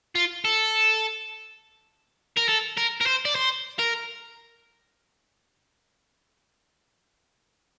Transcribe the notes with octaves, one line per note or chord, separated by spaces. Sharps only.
F4
A4
A#4
A4
A#4
A#4
C5
D5
C5
A#4